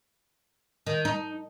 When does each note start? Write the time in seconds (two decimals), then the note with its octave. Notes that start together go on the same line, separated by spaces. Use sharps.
0.87 D#3
1.05 D#4